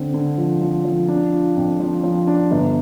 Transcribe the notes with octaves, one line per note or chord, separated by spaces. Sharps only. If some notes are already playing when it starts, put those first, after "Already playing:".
Already playing: D3 C4
D3
F3
F3
F3
D4
F4
F2
F3
F3
D4
G1